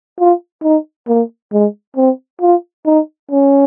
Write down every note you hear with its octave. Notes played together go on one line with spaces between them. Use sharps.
F4
D#4
A#3
G#3
C4
F4
D#4
C#4